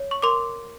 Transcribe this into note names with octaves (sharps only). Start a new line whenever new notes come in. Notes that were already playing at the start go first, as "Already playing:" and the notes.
Already playing: C#5
C#6
A#4 C6 D6